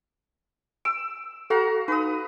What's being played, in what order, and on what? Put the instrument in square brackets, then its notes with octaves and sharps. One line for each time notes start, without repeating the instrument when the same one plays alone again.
[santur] E6 [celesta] D7
[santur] F#4 F5 A#5 [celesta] A4
[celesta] D#4 [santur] B4 D#6